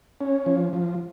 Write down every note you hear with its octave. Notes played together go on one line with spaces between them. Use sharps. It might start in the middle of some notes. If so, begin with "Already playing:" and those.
C#4
F3
F3